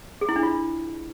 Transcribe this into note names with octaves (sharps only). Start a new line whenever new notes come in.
G#4
E4
D4
F4